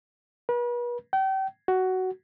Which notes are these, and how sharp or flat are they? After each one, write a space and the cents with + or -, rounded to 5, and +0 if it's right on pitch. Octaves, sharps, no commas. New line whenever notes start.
B4 -40
G5 -35
F#4 +10